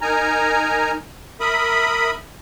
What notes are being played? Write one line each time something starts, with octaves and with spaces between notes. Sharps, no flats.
D#4 A#4 G#5 A#5
A#4 E5 B5 D#6